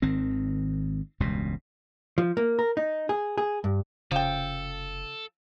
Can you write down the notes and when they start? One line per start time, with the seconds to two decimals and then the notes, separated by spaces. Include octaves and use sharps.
0.02 G#1 D#3 C4
1.20 E1 C#2 G2 B2
2.18 F3
2.37 A#3
2.59 A#4
2.77 D#4
3.09 G#4
3.38 G#4
3.64 G2
4.11 F1 C#3 F3 A4 G5